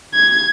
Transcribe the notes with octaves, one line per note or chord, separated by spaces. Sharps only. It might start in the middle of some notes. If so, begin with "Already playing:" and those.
G#6